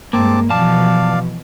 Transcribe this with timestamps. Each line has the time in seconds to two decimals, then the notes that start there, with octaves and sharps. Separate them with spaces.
0.13 G2 G#3 A#3 C4 A5 D6
0.50 B1 B2 E3 F3 D5 F5 A5